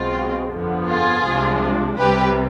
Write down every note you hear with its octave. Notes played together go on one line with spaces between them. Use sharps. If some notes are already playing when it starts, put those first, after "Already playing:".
Already playing: B1 B2 G#3 C4 F4
G1 F2 D3 F3 B3
F4 G#4
C2 C3 F3 G#3 D4
C2 C3 G3 G4 B4